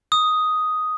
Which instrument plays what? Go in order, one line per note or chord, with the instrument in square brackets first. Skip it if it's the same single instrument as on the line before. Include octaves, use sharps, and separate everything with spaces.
[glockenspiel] D#6